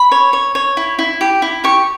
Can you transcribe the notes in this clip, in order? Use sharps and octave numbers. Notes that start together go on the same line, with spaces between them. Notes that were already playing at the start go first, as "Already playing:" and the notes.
Already playing: B5
C#5
C#5
C#5
E4
E4
G4
E4
G4 C#6